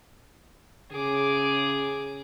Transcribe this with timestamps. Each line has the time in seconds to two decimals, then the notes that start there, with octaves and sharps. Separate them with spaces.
0.92 C#3 G#4 D6